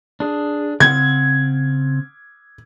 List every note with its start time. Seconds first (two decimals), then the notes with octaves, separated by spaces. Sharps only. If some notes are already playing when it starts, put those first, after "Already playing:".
0.20 D4 G#4
0.80 C#3 C4 F#5 G#6